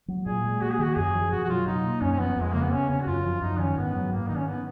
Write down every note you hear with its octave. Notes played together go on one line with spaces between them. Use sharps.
F#3
A#2 G#4
G#3
A#3 F#4
G#4
D#3 F#4
F#2 G#4
F3
B2 F#4
F#4
F#3 F4
B2 D#4
A#3
F#2 C#4
C#4
F3 B3
F2
G#3
C#3 A#3
B3
B3 C#4
C#3 C#4
F#4
F#2 F4
F3
F#2 D#4
D#3 C#4
G#2 B3
F#3
G#2 A#3
D#3 D#4
C#4
B3